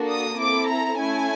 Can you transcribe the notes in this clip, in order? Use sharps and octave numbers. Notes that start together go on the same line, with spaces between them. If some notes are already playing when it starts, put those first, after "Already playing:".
Already playing: A#3 D4 F#4 A4
D#6
C4 E4 A4 D6
A#5
A3 C#4 E4 A4 G#5